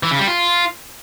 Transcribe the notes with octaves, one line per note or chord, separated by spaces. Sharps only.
E3
C#3
G3
F4